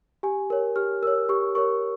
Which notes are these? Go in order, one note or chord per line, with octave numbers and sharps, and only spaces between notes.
G4 G#5
A#4 C#5
G4 F6
A#4 C#5 E6
G4 C#6
A#4 C#5 C#6